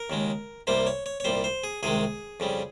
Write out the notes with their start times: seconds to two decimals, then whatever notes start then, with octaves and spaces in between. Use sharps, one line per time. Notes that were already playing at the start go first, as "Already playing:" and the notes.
Already playing: A#4
0.10 D#2 C#3 G#3
0.67 C2 C3 G3 A#3 C5
0.87 C#5
1.06 C#5
1.20 C#5
1.24 C2 A#2 G3 C5
1.44 C5
1.64 G#4
1.83 C2 C3 D#3 G#3 G#4
2.40 F2 C#3 G3